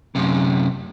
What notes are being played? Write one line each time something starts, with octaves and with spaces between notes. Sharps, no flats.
F#2 C3